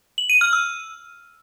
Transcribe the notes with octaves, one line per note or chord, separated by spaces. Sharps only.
F#7
D#7
F6
E6